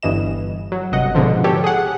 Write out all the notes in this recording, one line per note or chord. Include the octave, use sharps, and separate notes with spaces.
G1 G2 E3 D#5 E7
F#3
G1 C3 D#5 F#5
G#2 B2 D3 F3
G4 A4 C#5
G#4 F#5